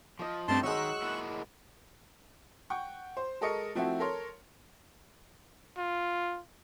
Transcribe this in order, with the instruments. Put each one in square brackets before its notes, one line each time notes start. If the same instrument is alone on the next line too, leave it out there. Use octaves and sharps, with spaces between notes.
[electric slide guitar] F3 [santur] D#5 D6
[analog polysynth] G2 A3 C4 [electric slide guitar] C#4 D#4 D5 [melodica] A5 C6
[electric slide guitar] D#3 D#4 [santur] F#3 G#3 [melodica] C#6 [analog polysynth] E6 F#6
[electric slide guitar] A#3 E4 F#5
[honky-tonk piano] F#5 G5 C#6
C5
G#3 A4 A#4 D#5 C#6 C#7
F3 A3 C4 E4 F#4
A4 A#4 C#5 C6
[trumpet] F4